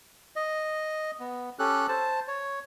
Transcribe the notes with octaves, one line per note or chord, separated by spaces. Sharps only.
D#5
B3
C#4 G4 A4 F#6
C5 A5
C#5